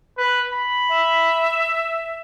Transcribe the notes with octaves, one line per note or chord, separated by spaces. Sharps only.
B4
B5
E5